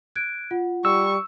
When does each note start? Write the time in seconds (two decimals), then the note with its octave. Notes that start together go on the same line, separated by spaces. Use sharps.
0.16 F#6 G#6 D7
0.51 F4 F#5
0.85 G3 C#6 E6